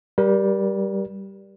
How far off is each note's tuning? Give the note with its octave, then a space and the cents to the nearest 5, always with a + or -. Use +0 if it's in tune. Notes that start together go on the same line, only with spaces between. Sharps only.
G3 -5 A#4 +35